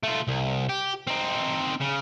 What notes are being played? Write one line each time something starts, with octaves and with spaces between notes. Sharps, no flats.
A3 F4
C2
G4
C4 D#4
C#3